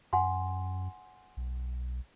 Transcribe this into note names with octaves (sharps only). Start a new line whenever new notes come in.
F#2 F#5 G#5 C6
B1